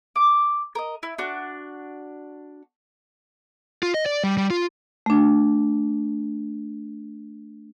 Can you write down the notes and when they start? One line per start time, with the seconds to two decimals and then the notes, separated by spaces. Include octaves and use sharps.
0.16 D6
0.75 A#4 D#5
1.03 E4
1.18 D4 F#4
3.83 F4
3.94 D#5
4.06 D5
4.24 G3
4.37 G3
4.51 F4
5.06 A3 D4